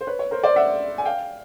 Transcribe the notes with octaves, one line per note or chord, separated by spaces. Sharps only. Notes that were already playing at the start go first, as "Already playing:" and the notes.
C5
B4 C#5
C#5
A#4 C5
C5 D5
E5 F#5
G#5
F5 G5